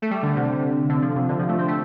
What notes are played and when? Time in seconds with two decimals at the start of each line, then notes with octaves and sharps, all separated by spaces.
0.02 A3
0.11 G3
0.23 D3
0.36 C3
0.89 D3
1.02 F3
1.16 C3
1.29 D3
1.39 F3
1.49 A3
1.58 C4
1.68 A3